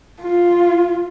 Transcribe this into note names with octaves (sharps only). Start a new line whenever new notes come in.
F4